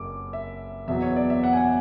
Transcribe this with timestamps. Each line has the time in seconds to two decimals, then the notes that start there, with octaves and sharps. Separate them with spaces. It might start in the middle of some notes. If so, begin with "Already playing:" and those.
Already playing: F#1 D6
0.33 E5
0.87 E2 B2 F#3 E5
1.02 C#5
1.16 D5
1.30 E5
1.44 F#5
1.53 G#5
1.57 F#5